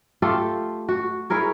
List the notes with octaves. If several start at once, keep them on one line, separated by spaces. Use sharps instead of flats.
A3 F4 G4 A4
F#4
E4 G#4 A#4 C#5